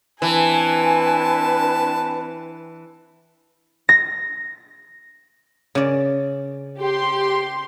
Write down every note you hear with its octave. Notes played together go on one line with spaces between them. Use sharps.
E3 C4 D4 B4 G#5 A5
A#6
C#3 D5
G4 C6